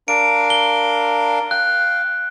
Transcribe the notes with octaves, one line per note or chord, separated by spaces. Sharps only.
D4 A#4 F5 D7
G7
F5 G5 F#6